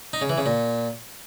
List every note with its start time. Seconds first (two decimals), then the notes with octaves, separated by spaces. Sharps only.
0.13 D#4
0.21 C#3
0.30 E3
0.38 C#3
0.46 A#2